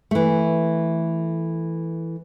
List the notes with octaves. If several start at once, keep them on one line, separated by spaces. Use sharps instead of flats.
E3 A3